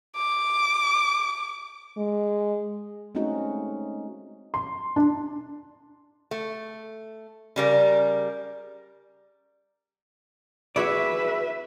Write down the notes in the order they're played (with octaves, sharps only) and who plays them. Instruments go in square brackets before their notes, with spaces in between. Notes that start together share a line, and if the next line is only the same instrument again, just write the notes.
[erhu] D6
[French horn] G#3
[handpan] G#3 A3 C4 C#4 D#4 F#4
[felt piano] C6
D4
[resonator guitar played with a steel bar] A3
C#3 G3 A#4
[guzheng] E4 C#5 [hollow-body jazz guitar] F#4 G#4 D5 [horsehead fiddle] B4 E5